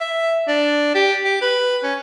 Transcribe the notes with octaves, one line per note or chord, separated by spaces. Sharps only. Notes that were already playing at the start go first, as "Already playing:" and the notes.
E5
D4
G4
G4
B4
C#4